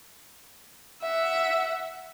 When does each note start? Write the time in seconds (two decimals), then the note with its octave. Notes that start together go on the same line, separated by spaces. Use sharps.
1.02 E5 F#5